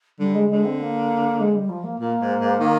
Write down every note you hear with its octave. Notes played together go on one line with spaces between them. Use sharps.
D3 G3
G#3
D3 G#3
C4
A#3
G#3
G3
F3
A#3
A#2 A#3
G#2
G#2
D#3